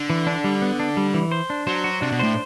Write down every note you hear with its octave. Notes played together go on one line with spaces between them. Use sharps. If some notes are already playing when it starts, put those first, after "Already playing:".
Already playing: D3
E3
D4
G3
B3
D4
G3
E3
C5
D4
F#3 C5
F#4
C3 D4
B2
A2 C5